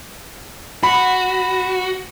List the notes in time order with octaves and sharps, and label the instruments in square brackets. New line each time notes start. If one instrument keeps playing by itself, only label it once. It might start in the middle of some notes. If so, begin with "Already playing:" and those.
[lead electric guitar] F#4 [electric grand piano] B5